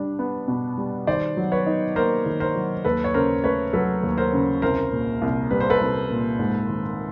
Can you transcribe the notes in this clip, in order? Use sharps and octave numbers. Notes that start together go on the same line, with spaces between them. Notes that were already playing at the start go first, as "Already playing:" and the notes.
Already playing: G3 D4
B3
B2
G3
D#3 C5 D5
F#3
B4 C#5
D#4
A#3 A#4 C5
D#3
A#4 C5
F#3
D#2 A4 B4
C#5
C#3 A#4 C5
A3 B4 C#5
F#3 A4 B4
D#2
A#4 C5
C#3
C2 A#4 C5
A#2
C2
G3 B4
C5
A4 B4
C2
A#2
G#2
D#3